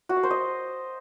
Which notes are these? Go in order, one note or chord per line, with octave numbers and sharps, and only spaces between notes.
F#4
F5
C5
D#5